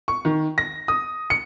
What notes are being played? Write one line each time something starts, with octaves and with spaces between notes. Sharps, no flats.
C#6
D#3
A#6
D#6
C#7